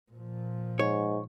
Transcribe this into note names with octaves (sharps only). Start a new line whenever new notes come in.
A#2 F3
G#2 C#5